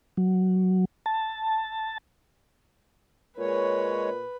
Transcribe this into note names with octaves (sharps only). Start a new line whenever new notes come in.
F#3
A5
A#2 G#3 B4 C#5